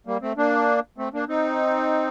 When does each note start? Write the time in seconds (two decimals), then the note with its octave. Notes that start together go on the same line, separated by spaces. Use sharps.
0.07 G3 A#3
0.22 A3 C4
0.37 A#3 D4
0.98 A3 C4
1.14 A#3 D4
1.28 C4 D#4